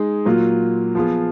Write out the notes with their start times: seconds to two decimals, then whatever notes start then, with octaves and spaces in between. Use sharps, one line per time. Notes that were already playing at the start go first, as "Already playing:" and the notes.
Already playing: G#3 D#4 G#4
0.25 A#2 F#3 A#3 F4
0.95 F3 B3 F4 G#4